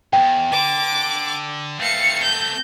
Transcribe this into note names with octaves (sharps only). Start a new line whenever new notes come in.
E2 G2 G5
D3 D6
A3 C4 F5 C#7
G6